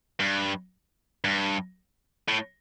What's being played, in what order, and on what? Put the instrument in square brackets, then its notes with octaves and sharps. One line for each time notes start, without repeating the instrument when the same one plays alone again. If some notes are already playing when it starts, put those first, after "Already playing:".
[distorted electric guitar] G2
G2
A2